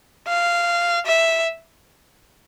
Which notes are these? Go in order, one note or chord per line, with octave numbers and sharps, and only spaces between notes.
F5
E5